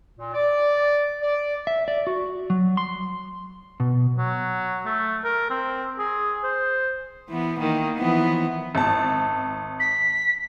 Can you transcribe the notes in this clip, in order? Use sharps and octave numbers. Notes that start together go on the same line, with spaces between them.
A#2
D5
D5
E5
D5
F#4
F#3
C6
B2
F#3
A3
A#4
C4
G#4
C5
E3 B3
D#3 A#3
E3 F3 B3
G#1 A5
B6